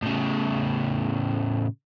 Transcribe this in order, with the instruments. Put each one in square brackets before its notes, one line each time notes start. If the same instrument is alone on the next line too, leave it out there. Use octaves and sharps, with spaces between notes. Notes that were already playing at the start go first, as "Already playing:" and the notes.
[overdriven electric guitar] A2 C#3